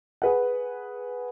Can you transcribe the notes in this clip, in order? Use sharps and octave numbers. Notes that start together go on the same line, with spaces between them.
G#4 B4 F#5